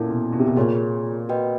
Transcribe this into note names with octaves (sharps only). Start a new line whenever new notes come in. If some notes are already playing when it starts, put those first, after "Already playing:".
Already playing: A#2 C#4 E4 A4
B2
B2
C3
B2
A#2 F4 G#4 C#5
F#4 B4 D#5 G5